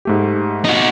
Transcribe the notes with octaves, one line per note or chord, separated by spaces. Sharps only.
G#2 A3 G4
D#4 F#4